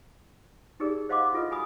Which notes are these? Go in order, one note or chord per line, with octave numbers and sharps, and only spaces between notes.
D#4 G4 G#4 A#4 D5
C5 D#5 F5 F#5 C6 D6
E4 F4 A4 B4 D#5
F#4 A4 G#5 B5 D#6